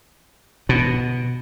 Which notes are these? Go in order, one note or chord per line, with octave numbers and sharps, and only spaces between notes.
B2